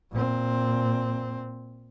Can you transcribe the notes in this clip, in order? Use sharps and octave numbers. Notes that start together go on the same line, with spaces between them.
A#2 C4